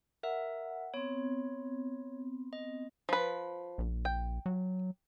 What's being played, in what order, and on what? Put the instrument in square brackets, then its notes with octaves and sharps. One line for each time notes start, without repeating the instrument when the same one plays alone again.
[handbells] A#4 E5 [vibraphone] F#5
[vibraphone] B3 C4 [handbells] C#5
[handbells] D#5
[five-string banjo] F3 B4
[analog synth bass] A#1
[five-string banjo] G5
[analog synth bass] F#3